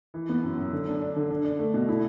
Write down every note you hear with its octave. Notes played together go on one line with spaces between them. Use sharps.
E3
B3
F#2
F#2
D3
D4
D4
D3
D4
D4
A3
B2
E4